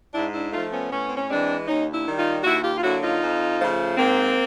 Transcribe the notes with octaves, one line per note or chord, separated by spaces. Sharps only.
G#2 D4 E4
D4 E4
F3 A3 D#4 F4
B3 C#4
A2 B3 C#4
C4
C#4
E3 G#3 C4 D4
D#2 C#4 D#4
D4 E4
D#3 G3
D#4 F4
D#2 E4 F#4
F4 G4
F4
D3 F#3 A#3 E4 F#4
D#4 F4
F2
C#3 F3 A3
G#2 A#3 C4